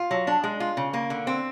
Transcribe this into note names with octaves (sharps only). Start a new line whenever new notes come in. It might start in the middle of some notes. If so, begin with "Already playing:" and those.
Already playing: F4
F#3
D4
G#3
F4
C#3
A#3
D3
C4